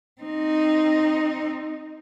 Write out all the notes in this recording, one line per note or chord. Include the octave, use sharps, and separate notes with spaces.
C4 D#4